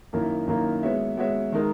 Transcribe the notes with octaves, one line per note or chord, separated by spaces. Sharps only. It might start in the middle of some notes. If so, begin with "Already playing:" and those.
F#2 D#3 A#3 E4 A#4
F#2 D#3 A#3 E4 A#4
G#3 B3 F#4 C#5 E5
G#3 B3 F#4 C#5 E5
D#3 G#3 D#4 A#4